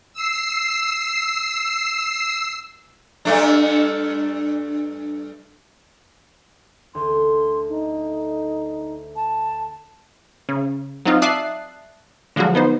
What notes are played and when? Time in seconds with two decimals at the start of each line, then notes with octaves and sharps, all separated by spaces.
0.13 E6 C7
3.25 G2 A3 D4
6.95 D2 C6
7.68 D#4
9.16 A5
10.49 C#3
11.05 F#3 C4 D#4 F4
11.22 D5 E5 A5 D#6 F#6 C7
12.36 D3 F3 F#3 G#3 F#4
12.55 B3 D#4 C5